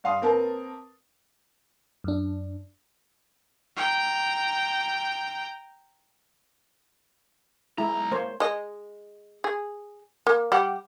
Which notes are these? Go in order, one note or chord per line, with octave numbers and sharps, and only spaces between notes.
G2 F5 C6 D#6
A#3 C4 A#4 B4 A5
F#2 D4
G5 A#5
B1 G#3 E4 A#5
A#3 C5 C#5
G#3 D#5
G#4
A#3
G3 G4 F#5